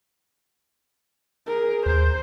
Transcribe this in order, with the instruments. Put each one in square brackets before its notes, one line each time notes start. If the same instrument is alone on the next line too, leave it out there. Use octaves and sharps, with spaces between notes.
[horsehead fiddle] G#4 A#4
[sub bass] D#2 [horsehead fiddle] C5